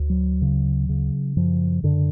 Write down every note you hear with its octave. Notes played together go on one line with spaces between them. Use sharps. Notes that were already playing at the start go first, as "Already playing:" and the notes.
Already playing: D2
F#3
C#3
C#3
F#2 F3
F#2 D3